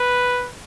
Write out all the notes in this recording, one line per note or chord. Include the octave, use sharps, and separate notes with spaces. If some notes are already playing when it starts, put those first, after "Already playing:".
Already playing: B4